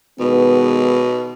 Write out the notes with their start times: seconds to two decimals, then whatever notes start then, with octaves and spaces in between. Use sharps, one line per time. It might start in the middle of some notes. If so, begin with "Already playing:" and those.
0.20 B2 D#3 G#3 B3